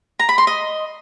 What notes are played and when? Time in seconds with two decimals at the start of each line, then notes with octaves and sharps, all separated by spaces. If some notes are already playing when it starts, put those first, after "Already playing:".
0.19 A#5
0.29 B5
0.38 C6
0.47 D#5